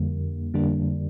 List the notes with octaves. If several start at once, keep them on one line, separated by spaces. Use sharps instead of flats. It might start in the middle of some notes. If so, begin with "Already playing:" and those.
Already playing: F2 D3 G3 A#3
F2 D3 G3 A#3 D4